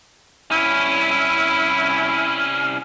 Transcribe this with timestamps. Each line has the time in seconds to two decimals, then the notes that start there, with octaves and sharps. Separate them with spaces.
0.51 C2 C#4 E4